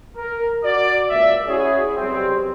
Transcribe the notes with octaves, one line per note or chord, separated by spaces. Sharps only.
A#4
F#4 D5
C#2 A#3 D5 E5
C#4 E4 F#4 G#4
B1 C3 G3 C4